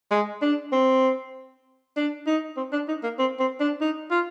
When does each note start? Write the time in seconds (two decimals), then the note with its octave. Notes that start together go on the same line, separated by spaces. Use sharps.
0.11 G#3
0.42 D4
0.72 C4
1.96 D4
2.26 D#4
2.57 C4
2.72 D4
2.88 D#4
3.03 A#3
3.19 C4
3.40 C4
3.60 D4
3.81 D#4
4.11 F4